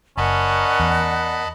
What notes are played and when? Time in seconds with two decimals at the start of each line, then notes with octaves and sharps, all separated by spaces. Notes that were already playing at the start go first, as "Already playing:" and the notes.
0.17 F#1 C#4 A#4 D5 D#5 F#5 A5 B5
0.80 E2